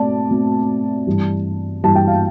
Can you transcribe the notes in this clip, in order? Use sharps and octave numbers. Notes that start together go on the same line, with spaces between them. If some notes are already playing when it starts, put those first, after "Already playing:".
Already playing: B2 A3 C4 D5 A5
B2 A3 C4
G2 E3 G3
G2 E3 G3 A5
G5
F5